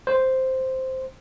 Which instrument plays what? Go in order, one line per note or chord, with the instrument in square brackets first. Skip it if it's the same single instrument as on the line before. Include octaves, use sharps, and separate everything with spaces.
[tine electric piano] C5